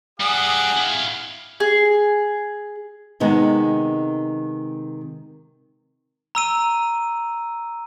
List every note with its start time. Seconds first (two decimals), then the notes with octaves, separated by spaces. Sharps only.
0.20 G3 D4 G#4 F#5 D#6
0.77 E4 F5
1.60 G#4
3.20 C3 D#3 G#3 B3
6.35 A#5 E6 D#7